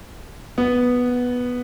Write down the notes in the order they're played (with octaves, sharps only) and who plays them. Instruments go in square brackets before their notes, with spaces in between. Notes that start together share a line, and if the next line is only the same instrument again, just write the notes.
[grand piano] B3